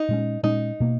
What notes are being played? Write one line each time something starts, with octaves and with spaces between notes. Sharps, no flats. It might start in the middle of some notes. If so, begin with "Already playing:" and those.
Already playing: D#4
A#2 G#3 C#4
A#2 G#3 C#4 D#4
B2 A#3